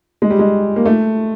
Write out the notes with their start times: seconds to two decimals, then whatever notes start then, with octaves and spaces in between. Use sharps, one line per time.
0.22 G#3
0.30 G3
0.39 G#3
0.76 A#3
0.85 A3